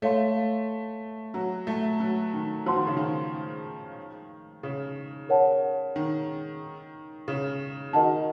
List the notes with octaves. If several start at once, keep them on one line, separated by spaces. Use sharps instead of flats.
A3 A4 C#5 F5 C6
F#3
A3
F#3
D#3
F3 F#4 C5 F#5 C6
D#3
C#3
D#3
C#3
A#4 C#5 F#5 A5
D#3
C#3
D#3 F#4 A#4 D#5 F#5 A5